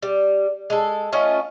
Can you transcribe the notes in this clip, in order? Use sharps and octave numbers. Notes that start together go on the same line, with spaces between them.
G3
G#3 A4
A3 C#4 F4 D#5